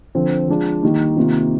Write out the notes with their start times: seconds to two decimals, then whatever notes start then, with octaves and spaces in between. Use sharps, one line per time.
0.15 D3 F3 C4
0.48 F3 G#3 D4 F4
0.83 D#3 G3 A#3 D#4
1.17 C3 D#3 A#3 F4